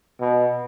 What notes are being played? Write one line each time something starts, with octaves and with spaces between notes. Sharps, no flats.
B2